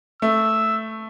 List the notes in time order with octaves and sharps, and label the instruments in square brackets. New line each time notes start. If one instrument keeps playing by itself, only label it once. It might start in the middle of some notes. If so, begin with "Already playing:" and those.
[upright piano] A3 [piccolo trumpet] E6